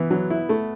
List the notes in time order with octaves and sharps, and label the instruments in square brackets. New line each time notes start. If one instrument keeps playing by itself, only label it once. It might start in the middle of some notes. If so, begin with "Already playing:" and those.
Already playing: [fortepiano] E3 [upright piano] B3
[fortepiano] F#3
E4
A3